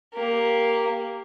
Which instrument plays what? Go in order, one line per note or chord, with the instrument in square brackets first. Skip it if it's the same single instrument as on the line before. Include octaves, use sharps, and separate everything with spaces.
[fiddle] A#3 G4